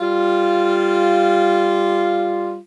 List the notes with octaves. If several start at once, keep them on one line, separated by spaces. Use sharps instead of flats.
G3 F4